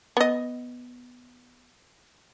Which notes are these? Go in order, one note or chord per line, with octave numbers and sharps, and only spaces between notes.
B3 D#5